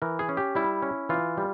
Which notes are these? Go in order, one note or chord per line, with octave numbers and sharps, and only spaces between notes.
E3 A#4
G#4
C#4
G4
G3 E4
C#4
E3 F4
G3